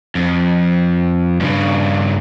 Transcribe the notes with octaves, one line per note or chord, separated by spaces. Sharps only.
F2
G2 C#3